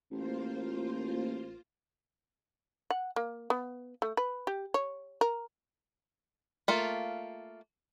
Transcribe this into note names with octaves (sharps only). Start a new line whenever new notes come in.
A1 A#3 F4 C5
F#5
A#3
B3
A3
B4
G4
C#5
A#4
A3 A#3 F4